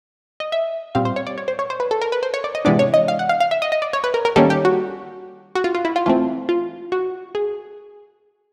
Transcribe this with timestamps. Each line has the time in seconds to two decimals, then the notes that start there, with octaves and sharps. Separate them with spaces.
0.40 D#5
0.52 E5
0.95 A#2 G3 C4 F5
1.05 C5
1.16 C#5
1.27 D5
1.38 C#5
1.48 C5
1.59 C#5
1.70 C5
1.80 B4
1.91 A4
2.01 A#4
2.12 B4
2.23 C5
2.34 C#5
2.44 D5
2.55 D#5
2.65 C3 E3 G#3 B3 D4 D5
2.79 C#5
2.94 D#5
3.08 F5
3.19 F#5
3.29 F5
3.40 F5
3.51 E5
3.62 D#5
3.72 D#5
3.82 D5
3.93 C#5
4.04 B4
4.14 A#4
4.25 A#4
4.36 D#3 G3 A#3 C#4 A4
4.50 G4
4.65 F#4
5.55 F#4
5.64 F4
5.75 F4
5.85 E4
5.96 F4
6.06 E3 A3 C4 F4
6.49 F4
6.92 F#4
7.35 G#4